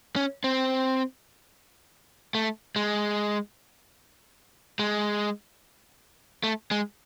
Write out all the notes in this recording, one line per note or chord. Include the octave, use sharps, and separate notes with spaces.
C#4
C4
A3
G#3
G#3
A3
G#3